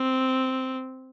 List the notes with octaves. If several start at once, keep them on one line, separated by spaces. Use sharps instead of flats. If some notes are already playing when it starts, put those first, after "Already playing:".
Already playing: C4